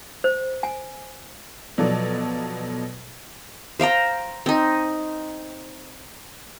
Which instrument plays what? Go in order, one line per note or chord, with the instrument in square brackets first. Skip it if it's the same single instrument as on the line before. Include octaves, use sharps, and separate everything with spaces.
[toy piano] C5
G#5
[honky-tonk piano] B2 F3 F#3 A4 D5
[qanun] C5 F5 G5 A#5
C4 D#4